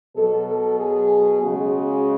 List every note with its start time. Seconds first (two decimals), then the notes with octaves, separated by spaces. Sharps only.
0.16 B2 F#3 A4
0.47 A4
0.80 G#4
1.43 C#3 G#3 F#4